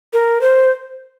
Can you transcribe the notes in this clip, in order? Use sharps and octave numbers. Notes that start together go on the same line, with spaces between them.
A#4
C5